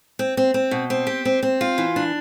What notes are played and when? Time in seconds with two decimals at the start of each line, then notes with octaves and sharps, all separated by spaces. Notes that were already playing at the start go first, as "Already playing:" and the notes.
0.19 C4
0.37 C4
0.54 C4
0.71 B2
0.90 C4
1.07 G4
1.25 C4
1.43 C4
1.61 F4
1.78 E3
1.96 D4